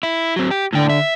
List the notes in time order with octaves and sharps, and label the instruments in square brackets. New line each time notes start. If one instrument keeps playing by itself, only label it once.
[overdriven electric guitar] E4
F#3 C4
G4
[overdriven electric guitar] A2 G5 [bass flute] D3
[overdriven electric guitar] E5